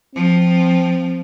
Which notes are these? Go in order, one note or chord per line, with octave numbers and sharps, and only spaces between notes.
F3 C4